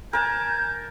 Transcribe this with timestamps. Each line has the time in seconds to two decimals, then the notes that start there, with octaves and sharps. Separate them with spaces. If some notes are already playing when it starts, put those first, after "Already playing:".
0.13 A#4 G#5 A5 G6